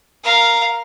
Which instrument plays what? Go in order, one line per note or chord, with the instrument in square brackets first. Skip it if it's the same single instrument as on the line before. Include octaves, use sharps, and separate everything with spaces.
[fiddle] A#4 F5